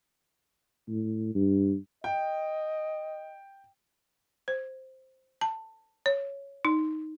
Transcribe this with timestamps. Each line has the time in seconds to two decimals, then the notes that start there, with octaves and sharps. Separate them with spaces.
0.88 A2
1.35 G2
2.04 D#5 G5
4.48 C5
5.41 A5
6.06 C#5
6.65 D#4